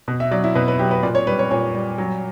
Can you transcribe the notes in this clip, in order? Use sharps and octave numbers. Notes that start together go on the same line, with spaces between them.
B2
E5
F#3 D5
E4
B2 B4
B4
F#3 G4
B4
A#2 D5
C#5
G3 B4
C#5
A#2 C#5
G3
F#3